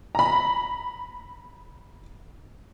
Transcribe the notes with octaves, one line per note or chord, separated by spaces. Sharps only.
A#5 B5